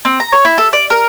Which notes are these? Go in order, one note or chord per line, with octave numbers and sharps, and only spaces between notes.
C4
A#5
C#5
E4
A4
D5
A#4